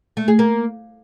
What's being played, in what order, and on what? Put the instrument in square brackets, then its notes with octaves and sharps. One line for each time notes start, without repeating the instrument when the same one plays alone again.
[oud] A3
G#4
A#3